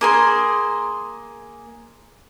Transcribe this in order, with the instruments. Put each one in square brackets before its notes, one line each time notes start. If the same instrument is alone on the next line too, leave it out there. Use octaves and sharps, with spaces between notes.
[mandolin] A#3 G#4 C6